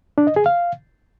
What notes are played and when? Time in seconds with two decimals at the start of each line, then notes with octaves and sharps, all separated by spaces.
0.18 D4
0.27 D#5
0.36 G#4
0.46 F5